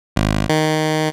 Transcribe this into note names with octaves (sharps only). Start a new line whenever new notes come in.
G#1
D#3